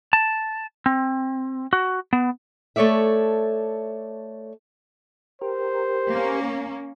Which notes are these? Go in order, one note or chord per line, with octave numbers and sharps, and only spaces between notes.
A5
C4
F#4
B3
A3 A4 C#5 D5 E5
G4 A#4 C5
A#3 C#4